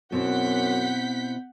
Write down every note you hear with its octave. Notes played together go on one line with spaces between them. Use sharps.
F#2 B2 C4 E4 F#5 G6 B6